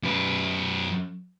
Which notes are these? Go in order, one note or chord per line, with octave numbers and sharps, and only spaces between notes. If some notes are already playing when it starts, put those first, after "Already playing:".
F#2 B4